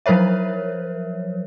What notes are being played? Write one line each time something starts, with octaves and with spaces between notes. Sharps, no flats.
F3 F#3 A#4 C5 C#5 E5